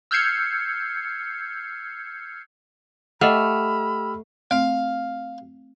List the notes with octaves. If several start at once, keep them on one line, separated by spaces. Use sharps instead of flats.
E6 F6 G6 G#6 C7 C#7
A3 G4 D#5 F#5 B5 E6 F6
A3 C4 F5